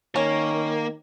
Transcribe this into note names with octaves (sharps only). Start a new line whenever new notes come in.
D#3 A#3 C#4